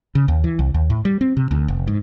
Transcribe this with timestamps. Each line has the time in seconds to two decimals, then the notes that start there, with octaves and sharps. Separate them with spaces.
0.15 C#3
0.28 D#2
0.44 E3
0.59 C2
0.74 D#2
0.90 A2
1.05 G3
1.21 C4
1.37 C3
1.51 D2
1.68 F1
1.87 G#2